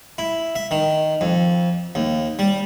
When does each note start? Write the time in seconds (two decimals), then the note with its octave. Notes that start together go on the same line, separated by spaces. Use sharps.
0.18 E4
0.55 E5
0.71 D#3
1.21 F2
1.95 D#2
2.39 G3